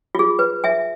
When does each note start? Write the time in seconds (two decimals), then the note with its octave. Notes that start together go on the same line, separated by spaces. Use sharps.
0.15 F4 G#4
0.39 B4
0.64 E5 G#5